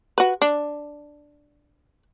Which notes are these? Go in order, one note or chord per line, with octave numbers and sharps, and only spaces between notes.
F#4 B4
D4